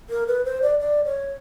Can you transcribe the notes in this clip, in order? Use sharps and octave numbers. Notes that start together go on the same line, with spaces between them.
A#4
B4
C5
D5
D5
C#5